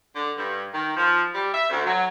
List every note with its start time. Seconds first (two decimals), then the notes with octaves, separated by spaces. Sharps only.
0.15 D3
0.37 G2
0.74 D#3
0.96 F3
1.34 G3
1.53 E5
1.70 D2
1.86 F#3